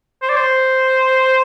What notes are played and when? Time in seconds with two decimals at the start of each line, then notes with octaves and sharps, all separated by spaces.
0.22 C5
0.29 D5
0.37 C5